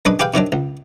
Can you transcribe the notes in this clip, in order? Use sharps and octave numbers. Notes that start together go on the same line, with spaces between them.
F#2 G#3 D4 B4 D#6
G4 G#4 B4 F5 G5
C3 D#3 F#3 D4
C#2